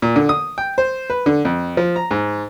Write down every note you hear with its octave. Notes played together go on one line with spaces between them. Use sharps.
A#2
D3
D#6
G5
C5
B4
D3
F2
F3
A#5
G#2